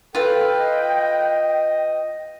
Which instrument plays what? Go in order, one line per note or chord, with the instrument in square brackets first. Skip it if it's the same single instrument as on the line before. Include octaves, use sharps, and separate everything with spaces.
[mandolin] F4 B4 [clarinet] A4 [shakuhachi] G5
[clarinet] D#5